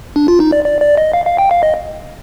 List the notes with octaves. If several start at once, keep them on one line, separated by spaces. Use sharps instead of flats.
D4
F4
D#4
D5
D5
D5
D#5
F5
F5
G5
F5
D#5